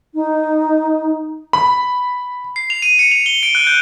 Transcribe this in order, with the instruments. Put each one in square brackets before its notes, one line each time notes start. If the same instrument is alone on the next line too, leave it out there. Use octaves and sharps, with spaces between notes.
[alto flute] D#4
[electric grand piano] B5
[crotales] C7
F7
D#7
C#7
F7
G7
D7
F#6
G6